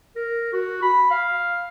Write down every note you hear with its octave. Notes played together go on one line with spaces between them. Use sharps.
A#4
F#4
B5
F5